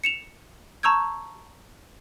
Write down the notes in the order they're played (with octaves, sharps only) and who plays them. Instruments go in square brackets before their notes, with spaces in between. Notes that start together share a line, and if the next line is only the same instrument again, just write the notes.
[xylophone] C#7 E7 F7
A5 A#5 C#6 E6 G6 G#6